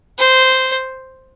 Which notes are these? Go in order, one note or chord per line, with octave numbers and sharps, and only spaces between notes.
C5